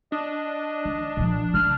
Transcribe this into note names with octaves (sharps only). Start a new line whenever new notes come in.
D4 D#5
D#3
A#2 F3
C#3 F3 F6